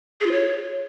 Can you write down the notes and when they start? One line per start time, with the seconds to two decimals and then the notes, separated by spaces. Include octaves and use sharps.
0.21 G#4
0.26 F4
0.32 C#5